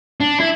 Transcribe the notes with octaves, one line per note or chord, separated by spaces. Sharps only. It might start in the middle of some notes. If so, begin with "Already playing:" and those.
D4
E4